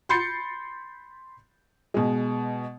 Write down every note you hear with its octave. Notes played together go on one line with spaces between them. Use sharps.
B5 C6 G6 A6 C7 C#7
B2 G#3